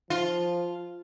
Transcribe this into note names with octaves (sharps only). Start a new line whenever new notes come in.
F3 F4